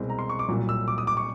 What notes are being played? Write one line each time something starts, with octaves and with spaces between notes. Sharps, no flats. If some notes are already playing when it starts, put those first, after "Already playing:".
Already playing: C2 B2 G#3 C4
A#5
C6
C#6
D6
C2 A#2 F#3
E6
D6
D#6
D6
C#6